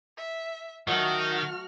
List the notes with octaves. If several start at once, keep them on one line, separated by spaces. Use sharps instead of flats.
E5
D#3 F#3 A3 F#4 F6